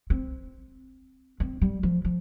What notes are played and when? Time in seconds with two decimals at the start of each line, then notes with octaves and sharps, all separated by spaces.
0.10 C4
1.40 C4
1.61 G3
1.83 F3
2.05 F3